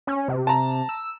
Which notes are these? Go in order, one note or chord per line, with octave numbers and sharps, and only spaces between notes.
C#4
C3
A5 A#5
E6